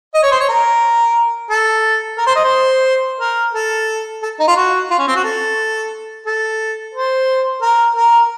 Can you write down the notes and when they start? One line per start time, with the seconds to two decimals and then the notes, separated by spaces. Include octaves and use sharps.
0.15 D#5
0.23 C#5
0.31 C5
0.40 C#5
0.49 A#4
1.50 A4
2.18 A#4
2.27 C5
2.35 D#5
2.44 C5
3.20 A#4
3.55 A4
4.23 A4
4.40 D#4
4.48 F4
4.56 F#4
4.91 F4
4.99 C#4
5.08 C4
5.16 F#4
5.24 A4
6.26 A4
6.94 C5
7.62 A#4
7.96 A#4